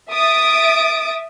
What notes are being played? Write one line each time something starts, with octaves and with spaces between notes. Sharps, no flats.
E5 D#6 A6 D7